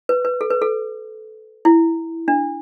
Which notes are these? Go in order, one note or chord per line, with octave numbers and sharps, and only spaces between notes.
B4
B4
A4
B4
A4
E4
D4